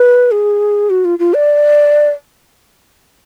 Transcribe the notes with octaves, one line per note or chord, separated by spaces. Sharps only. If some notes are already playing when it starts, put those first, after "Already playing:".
Already playing: B4
G#4
F#4
F4
F4
D5